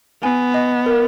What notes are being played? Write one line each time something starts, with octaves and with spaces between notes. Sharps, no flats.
B3 G#5
D#5
A#4